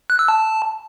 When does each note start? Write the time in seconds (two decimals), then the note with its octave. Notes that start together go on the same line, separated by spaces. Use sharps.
0.10 F#6
0.19 E6
0.28 A5